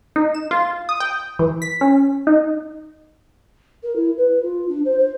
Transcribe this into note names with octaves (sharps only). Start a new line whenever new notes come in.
D#4
E7
F4
D#6
G5
E3
B6
C#4
D#4
A#4
E4
B4
F4
D4
C5
C5